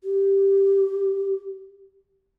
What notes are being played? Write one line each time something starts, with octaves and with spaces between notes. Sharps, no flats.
G4